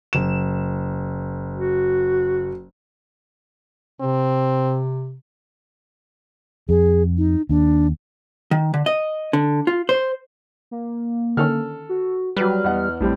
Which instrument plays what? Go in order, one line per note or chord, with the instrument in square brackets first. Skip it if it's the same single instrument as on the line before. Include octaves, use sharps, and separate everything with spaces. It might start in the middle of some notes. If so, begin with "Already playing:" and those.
[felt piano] F#1 E7
[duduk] F#4
[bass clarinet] C3 [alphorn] C4
[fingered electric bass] F2 [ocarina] G#4
[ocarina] D#4
[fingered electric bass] D#2 [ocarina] D4
[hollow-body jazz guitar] D#3
D3
D#5
D3
F4
C5
[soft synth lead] A#3
[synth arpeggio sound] D3 D#3 C#4 [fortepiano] A4 F6
[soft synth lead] F#4
[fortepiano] F#3 B4 [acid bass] G3 [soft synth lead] F6
[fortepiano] E2 D#5 F#5
[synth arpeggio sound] A#1 [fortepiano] A2 G3 C4